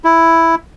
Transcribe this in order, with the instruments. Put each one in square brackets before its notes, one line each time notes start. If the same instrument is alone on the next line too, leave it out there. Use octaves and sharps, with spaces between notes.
[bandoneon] E4